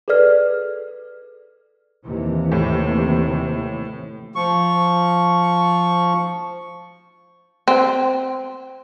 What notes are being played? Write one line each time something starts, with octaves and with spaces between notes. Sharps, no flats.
G#4 A4 B4 D5 F6
D#2 C3 E3
A2
F3 C#6
C4